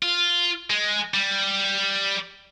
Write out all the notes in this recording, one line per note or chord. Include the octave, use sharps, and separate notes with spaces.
F4
G#3
G3